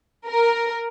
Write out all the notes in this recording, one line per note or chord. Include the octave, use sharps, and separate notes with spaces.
A#4